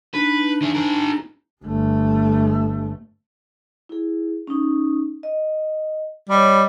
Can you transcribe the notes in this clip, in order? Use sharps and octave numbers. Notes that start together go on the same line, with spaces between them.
D4 D#4 B4
E3 G#4
G#4 A#4
G1 A3
E4 G#4
C#4 D#4
D#5
G3 C#5 D#5 B5